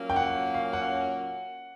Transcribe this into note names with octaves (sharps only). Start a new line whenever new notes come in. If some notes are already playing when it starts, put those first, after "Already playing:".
Already playing: A#2 F#3 A#3 C#4
G5
F#5
F5
F#5